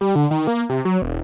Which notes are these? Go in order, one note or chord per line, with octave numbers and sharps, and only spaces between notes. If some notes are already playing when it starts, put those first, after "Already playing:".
G3
D3
D#3
A#3
C3
F#3
E1